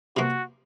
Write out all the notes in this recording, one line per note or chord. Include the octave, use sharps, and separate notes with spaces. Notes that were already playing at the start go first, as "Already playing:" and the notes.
C3 F3 A#3 F#4